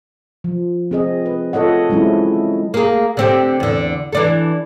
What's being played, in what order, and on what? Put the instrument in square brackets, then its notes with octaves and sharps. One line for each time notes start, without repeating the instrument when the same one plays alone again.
[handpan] F3
C4 G#4 D#5
B4
F4 A4 C#5 D#5 F#5
F#3 G#3 C4 C#4 E4 F#4
[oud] A#3 G#4
D3 C4 G4
E2 D3
E3 D4 A4